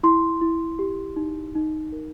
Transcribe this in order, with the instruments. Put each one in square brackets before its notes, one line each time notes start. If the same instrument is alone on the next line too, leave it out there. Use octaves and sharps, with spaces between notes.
[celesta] E4 C6
E4
G4
D#4
D#4
A#4